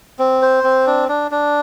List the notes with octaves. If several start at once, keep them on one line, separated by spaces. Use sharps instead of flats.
C4
C5
C4
D4
D4
D4